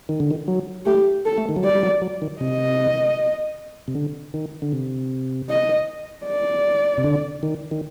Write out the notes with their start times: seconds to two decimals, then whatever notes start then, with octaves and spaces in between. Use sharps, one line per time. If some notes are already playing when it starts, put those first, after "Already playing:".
0.09 D#3
0.20 D3
0.31 D#3
0.48 F#3
0.86 A3 G4
1.25 A4
1.38 A3
1.49 D#3
1.56 F#3
1.63 G3 D5
1.75 G3
1.83 F#3
2.02 F#3
2.22 D#3
2.41 C3 D#5
3.88 C3
3.95 D3
4.34 D#3
4.62 D3
4.72 C3
5.50 D#5
6.27 D5
6.98 C3
7.04 D3
7.43 D#3
7.71 D#3